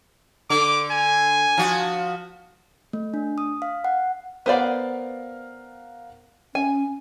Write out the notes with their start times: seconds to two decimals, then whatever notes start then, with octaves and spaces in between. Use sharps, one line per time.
0.50 D3 D6
0.91 G#5
1.58 F3 F#4
2.93 A3
3.14 D4
3.38 D#6
3.62 F5
3.84 F#5
4.46 B3 A#4 C5 D5 F5 F#5
6.55 C#4 G#5